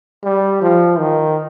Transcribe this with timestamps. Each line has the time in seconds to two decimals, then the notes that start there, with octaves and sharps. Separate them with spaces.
0.24 G3
0.62 F3
0.99 D#3